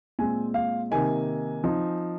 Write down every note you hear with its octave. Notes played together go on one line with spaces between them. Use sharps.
A#2 G#3 C4 G#5
F5
C3 D#3 A#3 D#4 G#5
F3 C4 D#4